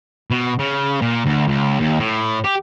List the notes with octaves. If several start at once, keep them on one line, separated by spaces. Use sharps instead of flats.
B2
C#3
A#2
D2
C#2
D#2
A2
G4